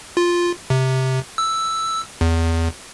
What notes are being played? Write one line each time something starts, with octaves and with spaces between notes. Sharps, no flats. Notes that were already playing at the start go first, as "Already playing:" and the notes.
F4
C3
E6
E2